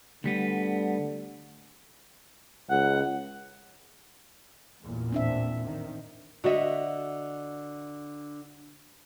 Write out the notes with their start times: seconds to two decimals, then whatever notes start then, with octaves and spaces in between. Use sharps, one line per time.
0.24 D2 D3 G3 B3
2.70 C#2 F#5
4.82 A1 E2 A#2
5.12 C4 D4 E5
5.66 D#3
6.44 D3 F#4 D#5 E5